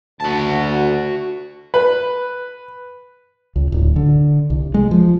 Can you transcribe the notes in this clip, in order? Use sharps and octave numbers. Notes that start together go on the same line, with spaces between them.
D2 F#4 A5
B4
C#2
D1
D3
C2
G#3
F3